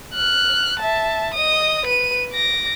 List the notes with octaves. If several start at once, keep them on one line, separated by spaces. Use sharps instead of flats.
F6 F#6
E5 A5
D#5 D#6
B4 D#7
D6 A#6